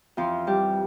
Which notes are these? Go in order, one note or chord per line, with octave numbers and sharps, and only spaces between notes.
F2 E3 F3 F4
G3 G4